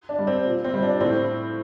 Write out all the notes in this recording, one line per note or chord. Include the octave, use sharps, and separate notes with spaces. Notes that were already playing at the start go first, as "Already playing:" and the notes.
D4
G3
C4
A#2
C4
G3
D4
A2 C4